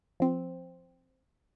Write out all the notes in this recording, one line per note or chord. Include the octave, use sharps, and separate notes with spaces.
F3 C4